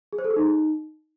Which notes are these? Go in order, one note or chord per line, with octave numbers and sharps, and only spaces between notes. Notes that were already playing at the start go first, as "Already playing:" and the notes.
G#4
C5
A4
G#4
D#4